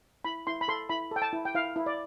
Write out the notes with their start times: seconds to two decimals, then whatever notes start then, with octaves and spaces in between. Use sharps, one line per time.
0.25 E4 B5
0.47 E4 C6
0.61 B5
0.68 A4 C6
0.89 E4 B5
1.11 A4 G5
1.22 A5
1.33 E4
1.45 G5
1.55 E4 F5
1.76 E4
1.86 D5